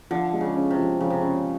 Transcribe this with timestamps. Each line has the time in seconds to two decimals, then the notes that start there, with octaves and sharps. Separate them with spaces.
0.11 D3 F3
0.33 G#3
0.41 C#3
0.55 C#4
0.71 C3
0.78 F3
1.00 C#3 F3
1.10 C3
1.21 C#3 C#4